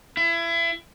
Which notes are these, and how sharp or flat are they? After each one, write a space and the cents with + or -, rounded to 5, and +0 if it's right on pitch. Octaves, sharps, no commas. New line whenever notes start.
E4 +30